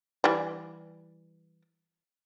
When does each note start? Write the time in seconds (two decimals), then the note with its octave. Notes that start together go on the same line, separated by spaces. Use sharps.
0.24 E3 G3